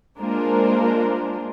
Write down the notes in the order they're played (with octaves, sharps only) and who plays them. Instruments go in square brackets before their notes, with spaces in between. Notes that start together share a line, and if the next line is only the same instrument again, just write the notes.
[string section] G#3 A#3 D4 F4 A#4 C5